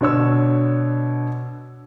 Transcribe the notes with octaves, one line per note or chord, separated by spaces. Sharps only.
B2 D3 C#5 E6